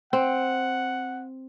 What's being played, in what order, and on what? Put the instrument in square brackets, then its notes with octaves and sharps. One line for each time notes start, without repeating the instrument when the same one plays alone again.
[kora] C4 [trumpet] F#5